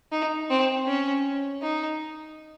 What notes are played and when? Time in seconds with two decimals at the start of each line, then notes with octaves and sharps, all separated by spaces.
0.12 D#4
0.50 C4
0.87 C#4
1.62 D#4